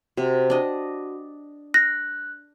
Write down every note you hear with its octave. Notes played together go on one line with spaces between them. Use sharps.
C3 F#4
D4 D#5
F#6 A#6